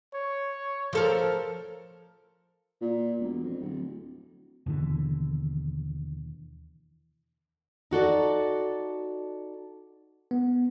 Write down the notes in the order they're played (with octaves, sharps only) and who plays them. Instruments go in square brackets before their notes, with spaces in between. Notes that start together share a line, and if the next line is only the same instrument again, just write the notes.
[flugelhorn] C#5
[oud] F3 A4 A#4
[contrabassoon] A#2
E1
F2
D1
[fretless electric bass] D#2 B2 D3 E3
[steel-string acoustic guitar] D#4 F#4 A4 D5
[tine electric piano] B3